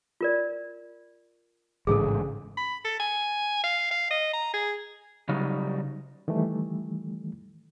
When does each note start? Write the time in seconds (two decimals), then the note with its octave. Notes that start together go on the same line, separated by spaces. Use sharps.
0.21 F4 A#4 D5
1.87 A1 G#2 C#3 G#4 A4
2.57 B5
2.85 A4
2.99 G#5
3.63 F5
3.91 F5
4.10 D#5
4.33 A#5
4.53 G#4
5.29 C#3 F#3 G3 D#4
6.28 D#3 E3 G3 A3